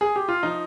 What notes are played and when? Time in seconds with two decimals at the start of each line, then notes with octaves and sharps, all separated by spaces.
0.01 G#4
0.16 G4
0.28 F4
0.43 F3 D#4